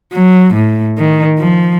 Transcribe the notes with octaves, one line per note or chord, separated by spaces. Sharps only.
F#3
A2
D#3
F3